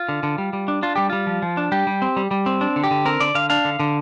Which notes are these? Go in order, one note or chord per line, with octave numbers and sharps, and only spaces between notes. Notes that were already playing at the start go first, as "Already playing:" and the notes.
Already playing: F4
D3
D3
G3
G3
D4
D4 F4
G3 G4
G3 F4
F3
F3
D4
G3 G4
G3
C4
G3
G3
C4
D4
D3
G4
D3
C4 A#4
D3 D5
D3 F5
D4 F5
D3
D3